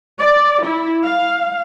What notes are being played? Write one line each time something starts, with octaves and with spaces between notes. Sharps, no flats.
D5
E4
F5